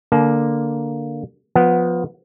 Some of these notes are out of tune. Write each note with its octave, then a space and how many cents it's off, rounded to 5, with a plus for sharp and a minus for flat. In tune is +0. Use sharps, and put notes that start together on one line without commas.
D3 +0 A#3 +5 A5 -40
F3 +20 B3 +0 F#5 +0